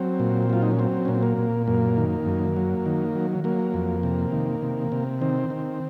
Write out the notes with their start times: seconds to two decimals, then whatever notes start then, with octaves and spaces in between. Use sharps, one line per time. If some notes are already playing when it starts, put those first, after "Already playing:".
Already playing: F#3 C4
0.19 A#2
0.50 F#3 F4
0.62 D#4
0.71 C#4
0.79 F#3 C4
1.05 A#2 C#4
1.15 C4
1.23 A#3
1.38 A#2
1.68 F#2 A#3
1.97 D#3
2.26 F#2
2.56 F#3
2.86 D#3
3.15 F#3
3.44 F#3 A#3
3.74 F2
4.03 C3
4.32 D#3
4.62 C3
4.92 C3
5.21 D#3 C4
5.50 D#3